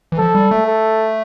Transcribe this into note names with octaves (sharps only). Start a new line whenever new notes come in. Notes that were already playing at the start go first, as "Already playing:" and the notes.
E3
F3 A4
G3
A3
A4